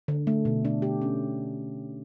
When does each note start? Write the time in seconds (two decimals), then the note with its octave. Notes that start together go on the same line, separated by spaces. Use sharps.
0.08 D3
0.27 A3
0.45 B2
0.65 D4
0.82 G4
1.02 C#4